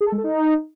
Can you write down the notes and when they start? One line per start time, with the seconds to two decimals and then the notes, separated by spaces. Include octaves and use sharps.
0.01 G#4
0.06 A4
0.12 G#3
0.18 A4
0.24 D#4